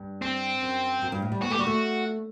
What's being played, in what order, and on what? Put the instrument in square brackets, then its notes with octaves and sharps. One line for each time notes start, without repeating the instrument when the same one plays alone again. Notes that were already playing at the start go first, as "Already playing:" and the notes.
Already playing: [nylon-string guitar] G2
[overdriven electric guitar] C4
[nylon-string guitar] F#2
F#2
G2
A2
G3
[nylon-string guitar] B3 [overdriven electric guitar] F#4
[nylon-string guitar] A3 [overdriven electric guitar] G4
[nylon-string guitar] G3 [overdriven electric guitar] F#4
[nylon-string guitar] A3